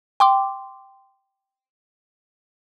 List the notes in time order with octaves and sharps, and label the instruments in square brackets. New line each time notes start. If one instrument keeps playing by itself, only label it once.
[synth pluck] G5 C6 D6